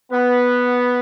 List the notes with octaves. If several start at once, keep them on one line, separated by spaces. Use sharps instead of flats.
B3